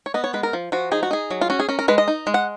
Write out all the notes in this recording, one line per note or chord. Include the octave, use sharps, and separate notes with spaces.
C#5
B3 D#5
C#5
G#3 B4
A#4
F3
F3 F#4
D#4 G#4
F#4
D#4 G#4
F#3
F4
C#4 F#4
G#4
C#4 A#4
A#4
G#3 B4
D#5
D#4
G#3
F#5